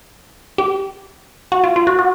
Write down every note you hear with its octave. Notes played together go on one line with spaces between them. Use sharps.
G4
F#4
F4
F4
F#4
F#4